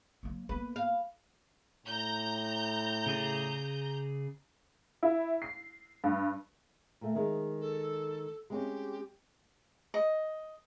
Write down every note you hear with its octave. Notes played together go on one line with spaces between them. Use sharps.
F#3 A#3
A#3 B3 B4
F5
A2 A#5 G6
C#3 G#4 D5
E4
C7
G2
A#2 A3
D#3 G#3
A4
G#3 C4 C#4 G4
D#5